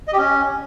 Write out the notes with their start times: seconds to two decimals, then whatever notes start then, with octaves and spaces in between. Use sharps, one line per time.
0.08 D#5
0.13 G4
0.18 C#4